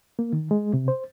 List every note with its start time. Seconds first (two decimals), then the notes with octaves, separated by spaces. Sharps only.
0.19 A#3
0.33 D#3
0.51 G#3
0.74 C3
0.88 C5